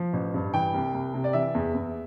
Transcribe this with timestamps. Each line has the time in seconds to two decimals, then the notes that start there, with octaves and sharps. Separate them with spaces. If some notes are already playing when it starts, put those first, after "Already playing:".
Already playing: F3
0.13 A1
0.34 G2
0.54 E3 G5
0.74 C2
0.94 C2
1.14 C3
1.24 D5
1.33 E3 E5
1.54 E2
1.74 E2